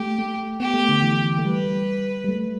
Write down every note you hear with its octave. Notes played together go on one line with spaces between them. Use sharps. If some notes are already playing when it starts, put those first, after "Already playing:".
Already playing: A3 G4
A3
B3 G4
A3
D3
E3
A3
G3 B4
G3
A3